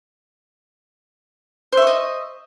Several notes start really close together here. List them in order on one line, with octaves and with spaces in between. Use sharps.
C5 E5 C#6 D#5